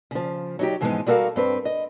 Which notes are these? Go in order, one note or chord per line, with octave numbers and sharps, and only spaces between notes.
C#3 F3
F#3 D#4 G4
G#2 E3 F3 G#3 B3 D#4
G3 F#4 A4 A#4 F5
G2 C4 B4
D#5